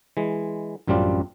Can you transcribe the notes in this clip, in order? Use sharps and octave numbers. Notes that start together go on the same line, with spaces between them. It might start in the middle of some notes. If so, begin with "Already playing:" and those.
E3 G#3
A1 F#2 G3 C4 D4 F4